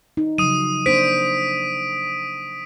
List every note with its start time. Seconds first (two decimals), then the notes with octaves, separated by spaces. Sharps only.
0.17 D#4
0.38 C#3 F3 F#3 D#6 D#7
0.86 A#3 D4 C5 B6 D7